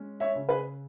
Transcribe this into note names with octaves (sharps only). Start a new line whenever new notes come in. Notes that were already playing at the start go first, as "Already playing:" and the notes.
Already playing: G#3 C#4
C#5 E5
C#3
G#4 B4